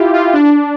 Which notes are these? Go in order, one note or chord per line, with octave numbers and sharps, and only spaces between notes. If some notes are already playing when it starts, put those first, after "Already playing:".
Already playing: E4 F4 G4
F4
D4